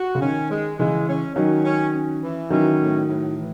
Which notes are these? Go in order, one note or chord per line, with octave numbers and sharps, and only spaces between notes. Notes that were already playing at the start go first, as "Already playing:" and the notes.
Already playing: F#4
C#3
D#3 C#4
G#3
C#3 E3 G#3
C#4
D#3 F#3 C#4
C#4
C#4
E3
D#3 F#3 C#4
A2
A2
E3